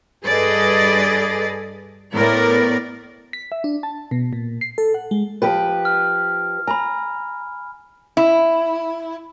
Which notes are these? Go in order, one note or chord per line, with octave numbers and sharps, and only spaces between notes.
G2 G#4 A4 B4 D5 D#5
A2 B3 A#4 D5
B6
E5
D4
A5
B2
A#2
C7
A4
F#5
G#3
F3 G4 B4
F6
G#5 A#5 B5
E4